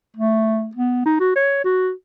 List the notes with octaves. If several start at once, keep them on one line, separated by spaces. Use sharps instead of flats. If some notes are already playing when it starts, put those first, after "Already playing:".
A3
B3
D#4
F#4
C#5
F#4